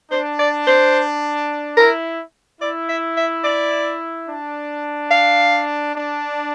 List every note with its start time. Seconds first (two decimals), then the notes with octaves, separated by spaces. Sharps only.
0.11 D4 C5
0.39 D5
0.67 C5
1.77 E4 A#4
2.61 E4 D5
2.89 E5
3.17 E5
3.44 D5
4.28 D4
5.11 F5
5.94 D4